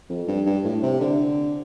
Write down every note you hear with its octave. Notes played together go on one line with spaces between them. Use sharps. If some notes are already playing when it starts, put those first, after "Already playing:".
F2
G2
G2
A2
C3
D3